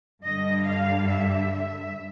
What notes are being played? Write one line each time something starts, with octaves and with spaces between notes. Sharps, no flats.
G2 D3 G3 D#5
F5
E5
E5